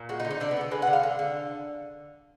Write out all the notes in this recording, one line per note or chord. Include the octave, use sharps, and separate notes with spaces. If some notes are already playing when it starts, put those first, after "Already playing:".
Already playing: A#2
G#3 F#4
D#4
D3
D#4
D3 D4
B3
D3 D4
G#3 B4
F#5
D3
F5
D3
D3